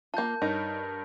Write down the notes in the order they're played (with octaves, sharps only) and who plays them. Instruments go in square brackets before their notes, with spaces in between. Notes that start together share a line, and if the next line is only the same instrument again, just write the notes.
[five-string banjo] A#3 F4 [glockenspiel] A5 G6
[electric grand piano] G2 A#4 C#5 [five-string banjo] D#4